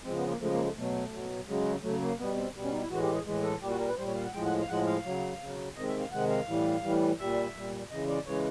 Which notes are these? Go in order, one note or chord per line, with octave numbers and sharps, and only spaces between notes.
C#3 F3 G#3 C4
B3
A#3
C#3 F3 G#3 A3
A#3
A3
B2 F#3 A3
B2 F#3
C#3 F#3 G#3
C#3 F#3 A3
A#3
B2 G3 B3
C4
B2 G3
C#4
D#4
E4
A2 E3 G#3 F#4
G4
G#4
A2 E3 G#3
A4
A#2 G3 G4
F#4
A#4
B4
A#2 G3 C5
C#5
F5
F#5
A2 F3 G#3 G5
F#5
F5
A2 F3 G#3 F#5
F5
C#3 F#3
C#3 F#3
C3 D#3 G#3 D#5
E5
F5
C3 D#3 G#3 F#5
F5
A2 E3 G3
A2 E3 G3
A#2 G3 E5
A#2 G3
C#3 E3 G#3 D#5
D5
C#3 E3 G#3 C#5